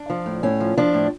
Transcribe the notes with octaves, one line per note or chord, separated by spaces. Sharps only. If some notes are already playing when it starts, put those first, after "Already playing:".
Already playing: D4
F3
A2
A2 C#4
F3
F3 D4
A2